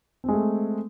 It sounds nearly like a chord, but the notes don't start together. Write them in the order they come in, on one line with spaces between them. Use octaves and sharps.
C4 G#3 A3